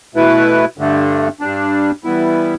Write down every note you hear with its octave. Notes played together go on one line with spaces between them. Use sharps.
B2 A3 E4 B4
G2 D3 A3
G2 G3 D4
E3 G3 B3 E4